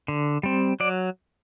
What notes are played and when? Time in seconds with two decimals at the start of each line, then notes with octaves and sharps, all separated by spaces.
0.08 D3
0.43 G3 C4
0.80 F#3 D5